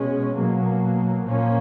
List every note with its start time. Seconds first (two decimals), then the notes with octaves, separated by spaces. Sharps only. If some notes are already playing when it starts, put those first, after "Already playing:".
Already playing: B2 G#3 C#4
0.34 B2 F#3 A#3
1.22 A#2 F3 A#3 C#4